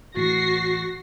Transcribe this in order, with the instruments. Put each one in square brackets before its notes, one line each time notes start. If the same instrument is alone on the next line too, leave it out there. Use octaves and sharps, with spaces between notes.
[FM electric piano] A2 E3 A6 [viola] F#4 [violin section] A#6 C7